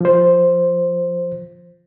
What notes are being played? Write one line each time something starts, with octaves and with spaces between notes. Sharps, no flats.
F3 C5